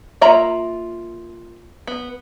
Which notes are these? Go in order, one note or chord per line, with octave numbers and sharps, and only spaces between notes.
A#3 F4 E5 A#5 B5
B3